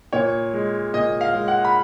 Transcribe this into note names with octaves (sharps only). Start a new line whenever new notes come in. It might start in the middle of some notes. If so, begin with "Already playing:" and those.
A#2 C#5
G#3
A#2 D#5
F5
G#3
F#5
B5